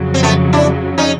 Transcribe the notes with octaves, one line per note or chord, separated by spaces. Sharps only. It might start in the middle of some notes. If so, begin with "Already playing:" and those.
Already playing: F2 C#3 F#3
C4
A3 B3
D4 E4
C#4 D#4